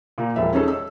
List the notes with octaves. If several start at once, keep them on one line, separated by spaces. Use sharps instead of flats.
A#2 A#3
E1 F3 E5
C#4 D#4 G#4 A4 C#5
E6